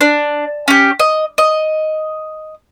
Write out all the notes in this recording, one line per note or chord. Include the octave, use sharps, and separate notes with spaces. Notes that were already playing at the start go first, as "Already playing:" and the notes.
D4
C#4 G4
D#5
D#5